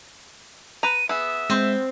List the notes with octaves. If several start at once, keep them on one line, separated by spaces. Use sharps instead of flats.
B4 A#5 D#7
B3 G#4 E5
G#3 C4